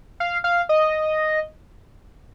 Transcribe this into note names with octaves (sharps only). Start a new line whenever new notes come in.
F5
F5
D#5